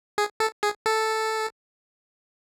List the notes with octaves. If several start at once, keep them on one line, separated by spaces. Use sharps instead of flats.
G#4
A4
G#4
A4